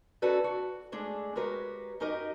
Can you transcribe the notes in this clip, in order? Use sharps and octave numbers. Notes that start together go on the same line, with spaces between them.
C#4 F#4 A4 B4 D5
F#4
G#3 A3 D4 G#4
G#3 F#4 G4 A#4 B4 C#5
F#2 D#4 G4 A#4 D#5